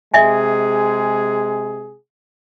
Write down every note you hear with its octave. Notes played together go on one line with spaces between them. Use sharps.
C3 G#3 G#4 D#5 E5 G#5